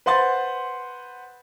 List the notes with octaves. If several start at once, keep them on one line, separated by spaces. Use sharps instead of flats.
B4 C5 F#5 C6 A6